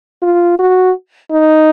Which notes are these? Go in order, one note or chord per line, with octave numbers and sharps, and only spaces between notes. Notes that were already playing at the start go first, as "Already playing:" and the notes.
F4
F#4
D#4